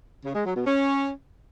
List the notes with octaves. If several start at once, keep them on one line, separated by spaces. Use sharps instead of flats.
C#3
G#3
F#3
B2
C#4